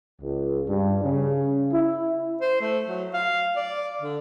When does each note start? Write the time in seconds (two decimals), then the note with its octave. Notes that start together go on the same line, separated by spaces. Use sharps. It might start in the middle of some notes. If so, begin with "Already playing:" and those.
0.21 C#2
0.68 G2
1.03 C#3
1.72 E4
2.41 C5
2.61 A3
2.86 F#3
3.14 F5
3.56 D5
4.02 D3